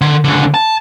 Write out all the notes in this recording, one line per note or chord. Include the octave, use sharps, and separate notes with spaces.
D3
C#2 D3
A5